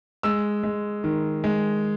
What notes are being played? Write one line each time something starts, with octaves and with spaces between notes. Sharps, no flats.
G#3 E6
G#3
D#3
G#3